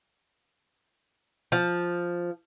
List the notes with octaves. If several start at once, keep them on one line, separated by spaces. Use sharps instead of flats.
F3